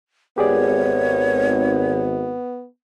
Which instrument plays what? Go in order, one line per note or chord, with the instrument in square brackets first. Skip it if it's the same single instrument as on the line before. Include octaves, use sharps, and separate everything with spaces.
[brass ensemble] G#1 [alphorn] B3 [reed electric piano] G4 G#4 D5 [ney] C#5